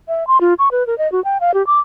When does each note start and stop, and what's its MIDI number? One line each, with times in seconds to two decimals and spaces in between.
0.08 0.27 76
0.27 0.40 84
0.41 0.54 65
0.59 0.69 85
0.72 0.86 71
0.87 0.97 70
0.98 1.10 75
1.12 1.23 66
1.24 1.38 79
1.41 1.54 77
1.54 1.65 67
1.67 1.80 86